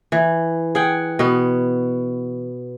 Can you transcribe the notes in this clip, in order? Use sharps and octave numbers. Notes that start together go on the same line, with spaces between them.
E3
G#4 F#5 G5
B2 B3